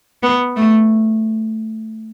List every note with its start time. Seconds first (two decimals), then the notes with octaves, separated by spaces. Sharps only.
0.23 B3
0.56 A3